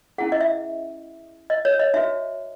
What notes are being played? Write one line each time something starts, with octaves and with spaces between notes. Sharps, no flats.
C#4 E4 G#4 F#5
D#5
E5
D#5
C#5
D#5
D#4 F#4 B4 E5